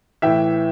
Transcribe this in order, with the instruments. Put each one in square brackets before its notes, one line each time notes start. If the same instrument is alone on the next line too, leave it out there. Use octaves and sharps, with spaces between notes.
[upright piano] A2 E3 E5 G5